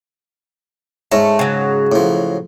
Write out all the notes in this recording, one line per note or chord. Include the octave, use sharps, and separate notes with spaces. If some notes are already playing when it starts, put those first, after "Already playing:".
G#2 A3 C#4 A#5
C#3 F#3
A2 F3